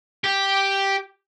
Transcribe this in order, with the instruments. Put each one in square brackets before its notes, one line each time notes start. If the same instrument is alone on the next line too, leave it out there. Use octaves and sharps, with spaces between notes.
[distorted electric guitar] G4